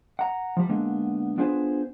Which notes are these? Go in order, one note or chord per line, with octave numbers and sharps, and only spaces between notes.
F#5 A#5
F3 G3
D3 G#3 A#3 B3
B3 D4 F4 G#4 B4 C5